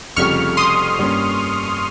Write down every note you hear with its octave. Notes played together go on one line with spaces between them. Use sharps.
F1 F2 C#3 G3 C#6 F6
C6 D#6
G2 G3 A#3 C#4